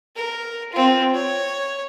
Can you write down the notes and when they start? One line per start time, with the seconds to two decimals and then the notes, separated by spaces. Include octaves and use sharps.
0.16 A#4
0.72 C4 F4
1.14 C#5